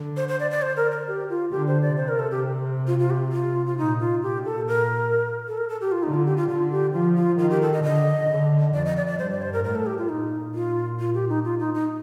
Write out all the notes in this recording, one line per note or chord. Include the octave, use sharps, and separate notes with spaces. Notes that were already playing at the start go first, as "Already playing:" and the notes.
Already playing: D3
C5
C5
D5
D5
C5
A#4
A#4
G4
F4
D3 G4
C5
D5
C3 C5
A#4
A4
G4
F4
F4
G4
F4
F4
A#2 D#4
F4
A#2 G4
A4
A#4
A4
A#4
A4
G4
F4
D3 D#4
F4
G4
F4
D3 F4
G4
F3 F4
F4
D#3 F4
G4
A4
D#5
D3 D#5
D3
F2 D5
D#5
D5
D5
G2 C5
D5
C5
A#4
A2 A#4
A4
G4
F4
A#2 D#4
F4
F4
G4
D#4
F4
D#4
D#4